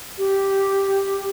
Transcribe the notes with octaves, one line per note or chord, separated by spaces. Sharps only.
G4